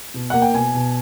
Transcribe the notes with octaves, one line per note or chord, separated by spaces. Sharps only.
B2
A#3 F#5
G5
B2 G#5
B2